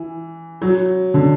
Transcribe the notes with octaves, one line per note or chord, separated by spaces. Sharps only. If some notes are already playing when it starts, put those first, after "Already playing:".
Already playing: E3
F#3
D3